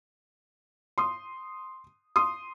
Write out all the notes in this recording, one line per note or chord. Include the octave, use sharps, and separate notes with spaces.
C6 D#6
C6 D#6